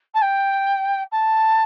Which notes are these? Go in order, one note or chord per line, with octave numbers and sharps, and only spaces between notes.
A5
G5
A5